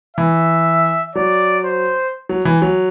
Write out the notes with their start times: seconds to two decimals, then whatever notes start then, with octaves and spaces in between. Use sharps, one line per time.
0.17 E3 E5
1.15 F#3 D5
1.65 C5
2.29 F#3
2.45 E3
2.62 F#3